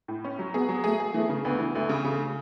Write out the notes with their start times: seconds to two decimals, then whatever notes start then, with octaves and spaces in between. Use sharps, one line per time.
0.08 A2
0.24 C#4
0.39 F#3
0.54 B3 G#4
0.69 F#3
0.84 A3 G#4
1.00 G#4
1.14 E3 A3
1.29 C#3
1.45 D2 B3
1.59 E3
1.75 D2 A3
1.89 C#3
2.04 C#3